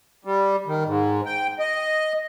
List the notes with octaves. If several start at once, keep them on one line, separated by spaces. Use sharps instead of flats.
G3
D#3
G#2
G5
D#5